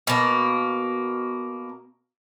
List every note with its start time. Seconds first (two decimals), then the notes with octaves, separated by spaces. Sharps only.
0.07 B2 A#3